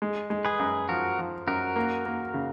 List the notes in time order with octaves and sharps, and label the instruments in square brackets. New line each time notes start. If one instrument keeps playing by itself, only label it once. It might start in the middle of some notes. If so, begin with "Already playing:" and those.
[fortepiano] G#3
G#3
[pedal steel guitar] G#4 B4
[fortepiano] F#2
[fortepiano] F3 [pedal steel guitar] F#4 A#4
[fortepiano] F3
[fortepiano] F#2 [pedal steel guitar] F#4 A#4
[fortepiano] A#3
A#3
C#3